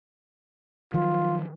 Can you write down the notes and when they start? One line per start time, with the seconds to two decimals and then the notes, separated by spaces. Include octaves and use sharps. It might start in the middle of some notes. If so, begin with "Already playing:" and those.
0.94 D#3 F3 F#3 F4